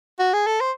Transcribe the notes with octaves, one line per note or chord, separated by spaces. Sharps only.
F#4
G#4
A4
C5